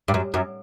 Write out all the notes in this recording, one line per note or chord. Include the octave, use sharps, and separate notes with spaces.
G2
F#2
F#2